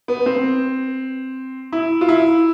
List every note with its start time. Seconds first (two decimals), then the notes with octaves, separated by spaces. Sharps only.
0.08 B3
0.26 C4
1.73 E4
2.01 F4
2.09 E4